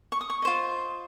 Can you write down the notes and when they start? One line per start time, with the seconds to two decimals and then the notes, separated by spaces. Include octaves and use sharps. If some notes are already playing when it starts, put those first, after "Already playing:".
0.12 C#6
0.21 D#6
0.30 C#6
0.42 F4 C5 D#5